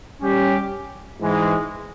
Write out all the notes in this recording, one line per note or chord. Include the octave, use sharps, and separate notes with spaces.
G3 C#4 G4
G#2 E3 G#3